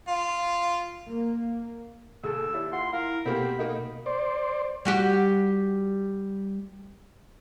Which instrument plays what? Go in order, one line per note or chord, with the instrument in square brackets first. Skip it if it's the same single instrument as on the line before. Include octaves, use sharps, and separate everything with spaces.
[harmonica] F4
[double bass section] A#3
[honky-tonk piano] D#2 [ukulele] G#4 A4 [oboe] E6
[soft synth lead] E4 [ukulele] G4 C#5 D5
[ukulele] F4 F#5 [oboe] C6
[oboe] A#4 [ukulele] F5
[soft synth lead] B2 [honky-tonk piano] A#3 C4 [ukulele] G4 F#5 [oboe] B5
[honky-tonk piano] A#3 D#4
[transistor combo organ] C5 D5
[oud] G3 F#4 G4